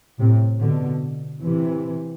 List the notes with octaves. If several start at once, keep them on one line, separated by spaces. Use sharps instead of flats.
A2 C3
B2 D3
C3 E3